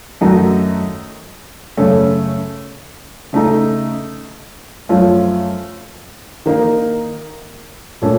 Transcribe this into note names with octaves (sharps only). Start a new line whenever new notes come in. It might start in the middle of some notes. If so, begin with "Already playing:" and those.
F#2 D#3 A3 D#4 F#4
F#2 C#3 A3 C#4 A4
C#3 A3 D#4 A4
F#2 F3 A3 C#4 F4
D#3 A#3 D#4
A#2 A3 C#4 A4